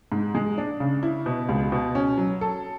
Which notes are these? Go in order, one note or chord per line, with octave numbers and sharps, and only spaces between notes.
G#2
G#3
D4
C#3
E4
B2
C#2
B2
C#4
F#3
A4